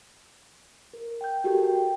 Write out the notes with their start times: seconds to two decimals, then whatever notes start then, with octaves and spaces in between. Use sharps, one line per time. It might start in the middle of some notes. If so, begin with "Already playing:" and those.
0.94 A#4
1.21 G5 G6
1.44 F#4 G4 A4 A#4
1.64 G5